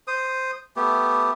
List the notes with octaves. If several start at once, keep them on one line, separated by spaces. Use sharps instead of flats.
C5 D#6
A3 B3 G4